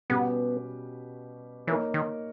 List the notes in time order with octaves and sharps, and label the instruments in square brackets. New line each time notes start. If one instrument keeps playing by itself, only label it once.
[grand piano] B2 G3 C#4 G4 B4 [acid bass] B3
[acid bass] E3 [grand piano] A#3 D#4 A#4 C#5
[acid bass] D#3